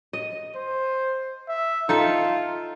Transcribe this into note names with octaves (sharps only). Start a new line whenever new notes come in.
D#5
C5
E5
D#4 F4 A4 E5